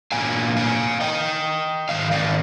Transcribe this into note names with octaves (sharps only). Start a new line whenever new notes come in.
A#2 F3 A#3 D4 F5 G#5
F5 G#5
D#5 G5
G#2 D#3 F5
D5 F5